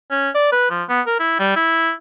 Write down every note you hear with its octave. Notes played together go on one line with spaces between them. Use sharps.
C#4
D5
B4
F3
B3
A#4
E4
G3
E4